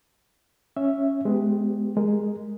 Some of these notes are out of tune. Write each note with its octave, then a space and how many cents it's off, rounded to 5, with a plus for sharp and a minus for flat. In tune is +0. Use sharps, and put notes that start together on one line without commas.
C#4 +0 E5 +0
G#3 +20 B3 +25 G4 +0
G#3 +0 A#4 +0